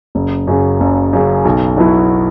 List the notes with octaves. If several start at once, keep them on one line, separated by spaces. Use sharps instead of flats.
F#1
F#2 C#3
F#1
F#2 C#3
B1
B2 F#3 B3 E4